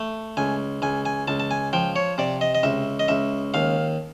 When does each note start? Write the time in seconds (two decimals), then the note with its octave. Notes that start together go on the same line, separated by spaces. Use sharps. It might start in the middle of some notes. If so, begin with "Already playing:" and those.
Already playing: A3
0.37 C#2 G#5
0.82 C#2 G#5
1.05 G#5
1.28 C#2 A5
1.40 A5
1.51 G#5
1.73 F3 G5
1.96 C#5
2.18 C3 D5
2.41 D#5
2.55 D#5
2.63 C#2 E5
2.99 D#5
3.08 C#2 E5
3.54 D#2 F5